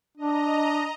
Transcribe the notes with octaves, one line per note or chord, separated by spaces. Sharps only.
D4 D#5 A#5